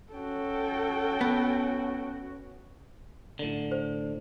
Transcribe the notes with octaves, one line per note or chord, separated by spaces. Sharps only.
C#4 F#4 A4 G5
B3
A2 D3
C5